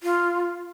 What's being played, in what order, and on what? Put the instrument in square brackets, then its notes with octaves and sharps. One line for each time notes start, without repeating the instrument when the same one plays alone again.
[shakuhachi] F4